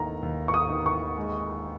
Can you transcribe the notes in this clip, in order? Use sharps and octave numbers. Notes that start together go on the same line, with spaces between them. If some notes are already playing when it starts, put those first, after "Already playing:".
Already playing: D#2 D#3 A#5
D#2
C#6
D#6
D#3
C#6
G#3